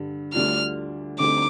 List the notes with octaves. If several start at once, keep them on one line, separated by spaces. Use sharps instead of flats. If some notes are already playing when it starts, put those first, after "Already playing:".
Already playing: G2 D3 G3
D2 D3 G3 D4 F4 F6
D2 D3 G3 C4 D#4 D6